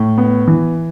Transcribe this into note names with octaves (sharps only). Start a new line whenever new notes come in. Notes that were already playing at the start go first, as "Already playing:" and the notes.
Already playing: A2
B3
E3